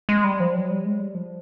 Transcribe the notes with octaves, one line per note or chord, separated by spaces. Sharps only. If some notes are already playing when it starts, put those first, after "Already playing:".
G#3
G3
F3
F#3
G3
G#3
G3
F3